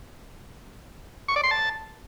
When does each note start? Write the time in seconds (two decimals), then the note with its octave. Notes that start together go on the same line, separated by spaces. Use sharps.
1.28 C#6
1.36 D5
1.43 C6
1.51 A5